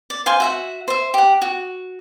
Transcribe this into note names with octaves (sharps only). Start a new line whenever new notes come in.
D5
C5 F5 G#5 C6
F#4 E5 F#5
C5 E5
G4 F#5
F#4